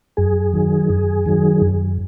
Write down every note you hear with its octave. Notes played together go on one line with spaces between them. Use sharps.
F#2 G#4
D#3 F#3
F#2
D#3 F#3
F#2